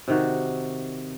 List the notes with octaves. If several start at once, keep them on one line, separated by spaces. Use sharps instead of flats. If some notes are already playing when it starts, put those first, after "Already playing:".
C3 D#3 F#4